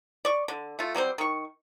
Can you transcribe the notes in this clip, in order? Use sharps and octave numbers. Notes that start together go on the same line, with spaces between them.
D5 C#6
D3
A3 F4
F#3 G3 C4 C5
D#3 C#6